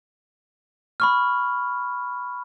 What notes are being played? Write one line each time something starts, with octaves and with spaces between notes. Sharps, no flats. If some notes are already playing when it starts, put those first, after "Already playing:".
B5 C#6 F6